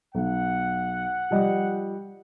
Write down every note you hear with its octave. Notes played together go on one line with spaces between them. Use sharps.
B1 F#5
F3 G3 D#5